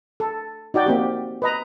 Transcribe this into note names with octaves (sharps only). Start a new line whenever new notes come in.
A4
D#4 F#4 D5 G5
A#3 C4 G4
B4 D#5 A#5